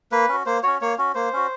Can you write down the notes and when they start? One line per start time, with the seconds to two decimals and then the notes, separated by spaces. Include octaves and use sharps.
0.12 A#3 B4
0.29 C#4 F#4
0.46 A#3 C5
0.63 C#4 F#4 C#5
0.81 A#3 C#5
0.98 C#4 F#4
1.15 A#3 C5
1.33 C#4 F#4